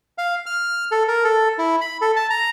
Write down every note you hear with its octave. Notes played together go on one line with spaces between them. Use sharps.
F5
F6
A4
A#4
A4
E4
B5
A4
A5
A#5